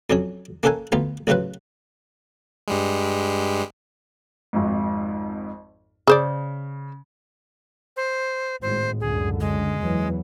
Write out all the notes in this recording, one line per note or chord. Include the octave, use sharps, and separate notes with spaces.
F2 F#3 C#4 C#5
A#3 C#4 A4 A#4 F#5 G#5
D2 B3 F4 A#5
A1 C#3 F#3 F4 B4 F#5
G2 G3 G#3
G#1 F2 G#2
C#3 G#4 C5 D5
C5
G#1 A2 G#3 C5
C#2 F#2 D3 G#4
G#3
E2 E3 F#3